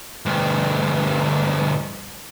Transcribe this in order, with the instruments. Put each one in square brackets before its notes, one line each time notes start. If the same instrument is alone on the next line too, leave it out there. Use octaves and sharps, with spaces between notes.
[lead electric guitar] D2 G2